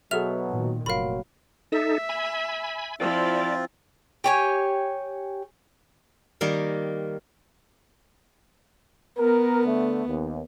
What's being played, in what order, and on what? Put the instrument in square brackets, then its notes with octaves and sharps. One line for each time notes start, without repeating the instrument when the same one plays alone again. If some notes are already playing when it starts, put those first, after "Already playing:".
[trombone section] B2 F#3 [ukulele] G#4 A4 E5 [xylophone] F6 F7
[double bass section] A#2 D#3
[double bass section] F1 A#2 [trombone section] F#3 [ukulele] F4 A#4 [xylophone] F5 B5
[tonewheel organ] D#4 A4 [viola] E5
[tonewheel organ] G#5 B5
[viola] F3 E4 [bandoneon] C4 F4 [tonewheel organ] D5
[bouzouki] G4 C#5 G#5
[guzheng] D#3 G3 A#3
[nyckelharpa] B3 [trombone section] A#4
[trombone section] D3 A3
D#2